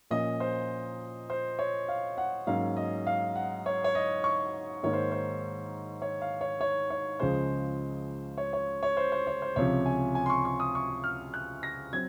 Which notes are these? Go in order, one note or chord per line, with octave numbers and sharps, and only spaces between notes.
A#2 F3 A#3 C#4 D#5
C5
C5
C#5
F5
F#5
G#2 F#3 A#3 C#4 F5
D#5
F5
F#5
C#5
C#5
D#5
C#6
G#2 D#3 A#3 C#5
C5
C5
C#5
F5
C#5
C#5
C#5
C#2 C#3 F3 G#3 C5
C#5
C#5
C#5
C5
C5
C#5
C5
C#2 C3 F3 C#5
G#5
G#5
C6
C#6
C#6
D#6
C#6
F6
F#6
A#6
F#3 C4 G#6